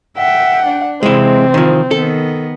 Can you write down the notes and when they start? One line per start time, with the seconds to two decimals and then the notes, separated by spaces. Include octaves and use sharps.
0.18 E5 F#5 G5
0.66 D4
1.03 C3 E3 G#3 C4 E4
1.54 D#3 F3
1.91 D#3 B3 A4